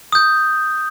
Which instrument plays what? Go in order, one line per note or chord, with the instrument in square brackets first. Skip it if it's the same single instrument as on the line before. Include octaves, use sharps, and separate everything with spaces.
[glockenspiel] D#6 G6